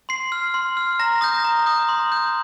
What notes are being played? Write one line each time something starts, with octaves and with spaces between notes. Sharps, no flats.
C6 C7
F6
C6
F6
A#5 A#6
D#6 G6 A#6
A#5
D#6 G6
C6
G6